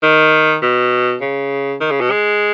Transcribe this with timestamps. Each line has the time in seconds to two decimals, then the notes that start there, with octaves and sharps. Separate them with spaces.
0.03 D#3
0.62 B2
1.21 C#3
1.80 D#3
1.91 C#3
2.00 B2
2.10 G#3